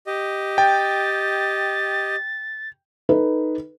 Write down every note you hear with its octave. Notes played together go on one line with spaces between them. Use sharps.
G4 D#5
G5 A6
D#4 A4 B4